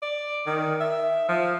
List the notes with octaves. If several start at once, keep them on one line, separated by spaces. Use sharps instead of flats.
D5
D#3
E5
F3